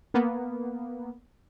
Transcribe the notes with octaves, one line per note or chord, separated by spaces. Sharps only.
A#3 B3